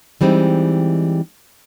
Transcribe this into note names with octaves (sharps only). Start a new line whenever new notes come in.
E3 G3 G#3 C4 D#4